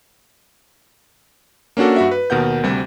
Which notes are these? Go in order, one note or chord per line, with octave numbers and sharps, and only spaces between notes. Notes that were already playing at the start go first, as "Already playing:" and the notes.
A#3 C#4 D4 F#4 A4
G2 F#4 E5
B4
D#2 B2 A#4 F#5 G6
D2 C3 G3